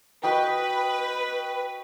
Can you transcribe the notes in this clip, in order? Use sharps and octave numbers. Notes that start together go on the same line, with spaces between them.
F#4 B4 D#5 G5